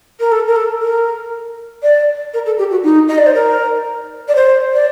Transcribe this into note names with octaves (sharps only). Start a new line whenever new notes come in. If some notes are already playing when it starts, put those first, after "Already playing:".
A#4
A4
A#4
A4
A#4
D5
A#4
A4
G4
F#4
D#4
D#5
D5
C5
A#4
D5
C5
D5